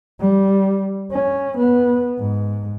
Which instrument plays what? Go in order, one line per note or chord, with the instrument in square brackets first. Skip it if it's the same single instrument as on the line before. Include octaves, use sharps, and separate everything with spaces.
[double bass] G3
C#4
B3
G#2